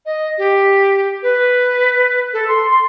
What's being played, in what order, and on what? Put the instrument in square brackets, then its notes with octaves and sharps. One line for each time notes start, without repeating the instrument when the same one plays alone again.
[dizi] D#5
G4
B4
A4
C6
C6